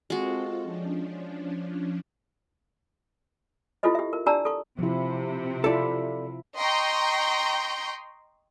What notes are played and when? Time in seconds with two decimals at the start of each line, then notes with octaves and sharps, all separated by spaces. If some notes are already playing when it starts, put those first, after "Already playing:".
0.10 G#3 C4 F4 F#4 A4
0.63 F3 C#4 D4
3.83 E4 F4 G4 A4 C5 D#5
3.95 G4 E5
4.13 A#4
4.26 D4 G4 D5 A5 A#5 E6
4.45 A4 C#6
4.79 C3 F3 E4
5.64 E4 F4 A4 D5 E5
6.57 D#5 G5 A#5 C6 C#6 G6